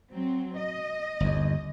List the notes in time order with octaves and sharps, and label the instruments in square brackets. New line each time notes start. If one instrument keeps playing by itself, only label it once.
[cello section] F#3 C4
D#5
[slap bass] G1 D#2